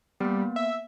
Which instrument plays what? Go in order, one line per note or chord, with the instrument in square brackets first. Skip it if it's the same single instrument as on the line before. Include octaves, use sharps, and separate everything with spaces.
[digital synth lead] G3 [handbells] A#3 B3
[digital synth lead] E5